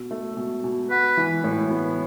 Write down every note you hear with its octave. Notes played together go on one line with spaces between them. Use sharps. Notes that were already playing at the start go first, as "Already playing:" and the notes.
Already playing: B2
A3
B2
B2
F#4 B4
E3
A2
B3